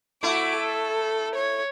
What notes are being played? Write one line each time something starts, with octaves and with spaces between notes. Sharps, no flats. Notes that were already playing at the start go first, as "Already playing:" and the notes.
A3 E4 F#4 D6
A4
C#5